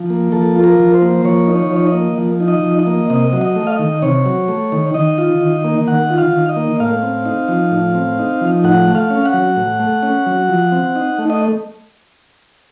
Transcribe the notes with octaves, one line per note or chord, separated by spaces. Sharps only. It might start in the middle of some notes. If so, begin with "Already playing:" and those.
Already playing: F3
A#3
F3 A4
F4
A#4
F3
C5
A#3
F3 C#5
D#4
C#5
F3
C#5
D#5
A#3
F3
D#4
D#5
F3
D#5
A#3
C3 D#5
F#3
D#5
A3
F5
D#5
D#3
C3 C#5
F#3
A3
D#3
D#3 D#5
F4
D#3
A#3
D#3 F#5
F4
F5
D#3
D#5
A#3
A2 F5
C4
D#4
F3
A2
C4
D#4
F3
A2 F#5
A3
F5
C#4
F#5
F#3
A2
A3
C#4
F#3
F3
C4
D#4
A3
D#5